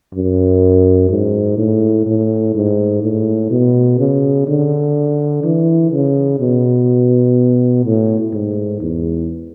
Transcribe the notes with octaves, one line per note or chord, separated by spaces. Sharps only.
F#2
G#2
A2
A2
G#2
A2
B2
C#3
D3
E3
C#3
B2
A2
G#2
E2